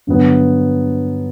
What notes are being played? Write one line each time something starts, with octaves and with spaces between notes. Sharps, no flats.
G2 D3 F#3 B3